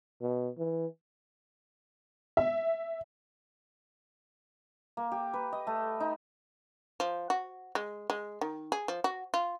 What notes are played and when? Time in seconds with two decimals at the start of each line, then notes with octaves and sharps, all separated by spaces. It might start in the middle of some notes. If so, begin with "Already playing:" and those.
0.21 B2
0.58 E3
2.37 E5
4.97 A#3
5.12 G4
5.34 B4
5.52 D#5
5.67 A3
6.00 D#4
7.00 F3
7.30 F#4
7.75 G#3
8.10 G#3
8.41 D#3
8.72 G#4
8.88 F3
9.04 F#4
9.34 F4